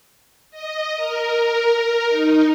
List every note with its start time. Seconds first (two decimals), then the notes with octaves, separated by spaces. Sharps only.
0.51 D#5
0.96 A#4
2.09 D#4